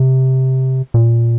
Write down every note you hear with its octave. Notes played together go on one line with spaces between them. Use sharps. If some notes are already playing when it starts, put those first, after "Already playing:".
Already playing: C3
A#2